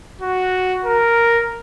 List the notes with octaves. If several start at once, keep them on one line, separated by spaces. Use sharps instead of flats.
F#4
A#4